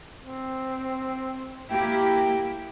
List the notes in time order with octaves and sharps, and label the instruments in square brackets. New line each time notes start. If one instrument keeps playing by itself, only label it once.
[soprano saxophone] C4
[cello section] A#3 E4 G4 [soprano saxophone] G5